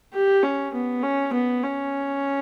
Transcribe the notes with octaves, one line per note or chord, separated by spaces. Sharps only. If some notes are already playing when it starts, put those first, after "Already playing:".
G4
C#4
B3
C#4
B3
C#4